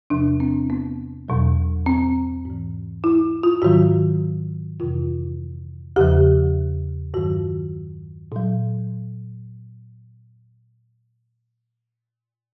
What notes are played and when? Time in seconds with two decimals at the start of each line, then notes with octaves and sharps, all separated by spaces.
0.10 E2 C3 F3 D4
0.40 C4
0.70 B3
1.28 E2 B2 F#3
1.86 C4
2.45 G#2 E3
3.04 E4
3.43 F4
3.62 G#2 D#3 F#3 F#4
4.80 F2 C3 E3 F4
5.96 E2 C#3 F3 G4
7.14 G2 D#3 F#3 F#4
8.32 A#2 F#3